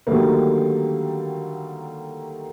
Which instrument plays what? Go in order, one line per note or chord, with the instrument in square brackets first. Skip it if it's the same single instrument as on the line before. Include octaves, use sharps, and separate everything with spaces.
[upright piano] D3 D#3 F#3 G3 A3 A#3